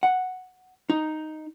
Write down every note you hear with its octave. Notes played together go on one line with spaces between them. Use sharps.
F#5
D#4